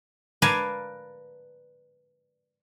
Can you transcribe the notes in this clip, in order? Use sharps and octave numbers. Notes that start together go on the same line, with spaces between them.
A#4 B4 D5 F5 G#5 A5